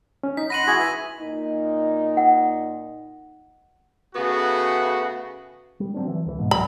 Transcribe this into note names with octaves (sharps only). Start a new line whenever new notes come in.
C#4
D#4 B6
F#5 B5 C6 A#6 D#7 F#7
E4 F#4 G#4 G#5 B5 G#6
B4 E5
A#2 D#4
F#5
C#3 A3 B3 F#4
G3
F#3 C4 D4
E3
C#2 E3
G#1 G#2 B2
C#2 F#3 B5